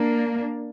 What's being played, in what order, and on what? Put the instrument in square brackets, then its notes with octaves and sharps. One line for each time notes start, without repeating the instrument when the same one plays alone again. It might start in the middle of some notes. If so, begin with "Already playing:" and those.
Already playing: [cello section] A#3 D4